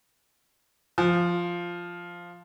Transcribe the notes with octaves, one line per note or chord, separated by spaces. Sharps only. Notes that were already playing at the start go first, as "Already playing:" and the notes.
F3